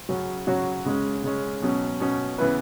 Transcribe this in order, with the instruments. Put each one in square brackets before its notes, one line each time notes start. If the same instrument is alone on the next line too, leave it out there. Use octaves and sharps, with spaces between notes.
[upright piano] C#3 F#3 C#4 F#4 C#5
C#3 F#3 C#4 F#4 C#5
C#3 G#3 C#4
C#3 G#3 C#4
B2 F#3 C#4
B2 F#3 C#4
C#3 E3 B3 E4 B4